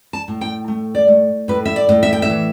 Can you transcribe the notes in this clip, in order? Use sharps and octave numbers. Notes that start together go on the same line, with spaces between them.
A5
A2
G5
A3
D5
A3
A2 B4
E5
D5
A2
E5
G5
E5
E3